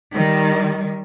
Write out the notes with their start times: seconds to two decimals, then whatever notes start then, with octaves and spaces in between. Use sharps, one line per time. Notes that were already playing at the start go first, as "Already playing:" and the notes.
0.14 D#3 G3